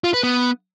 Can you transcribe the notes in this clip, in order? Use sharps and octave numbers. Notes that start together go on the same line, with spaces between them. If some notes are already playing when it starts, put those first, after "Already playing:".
F4
B4
B3